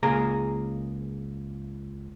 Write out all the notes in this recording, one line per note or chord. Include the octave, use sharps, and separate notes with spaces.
C#2 A#3 G#4 A#5